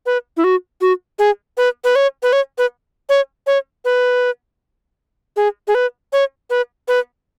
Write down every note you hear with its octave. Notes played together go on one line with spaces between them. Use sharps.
B4
E4
F#4
F#4
G#4
B4
B4
C#5
B4
C#5
B4
C#5
C#5
B4
G#4
G#4
B4
C#5
B4
B4